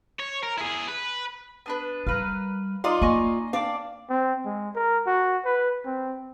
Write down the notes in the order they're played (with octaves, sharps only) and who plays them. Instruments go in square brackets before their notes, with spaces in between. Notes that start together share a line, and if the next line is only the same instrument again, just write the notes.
[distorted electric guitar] C#5
A#4
E4 G#4
B4
[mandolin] B3 D4 B4
[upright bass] G3 [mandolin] A#4 B4 F5
[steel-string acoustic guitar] D#4 F4 D5 [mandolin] C6 D#6
[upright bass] A#3 [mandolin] D#5 G#5 C#6
[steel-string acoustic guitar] D4 D5 [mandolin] F5 G5 D6
[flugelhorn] C4
G#3
A#4
F#4
B4
C4